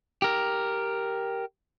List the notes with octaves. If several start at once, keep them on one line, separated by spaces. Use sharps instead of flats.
G4 A#4